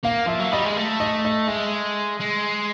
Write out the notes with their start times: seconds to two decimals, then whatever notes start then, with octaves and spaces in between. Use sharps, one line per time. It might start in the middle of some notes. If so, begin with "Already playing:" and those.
0.04 A#3 F5
0.27 F3 E5
0.40 F#3
0.52 G3 D#5
0.65 G#3
0.77 A3
1.00 D#5
1.25 D#5
1.48 G#3 E5
2.20 G#3